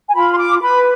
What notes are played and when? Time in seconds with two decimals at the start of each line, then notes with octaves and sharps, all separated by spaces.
0.08 G#5
0.14 F4 B5
0.33 C6
0.38 D6
0.62 B4 B5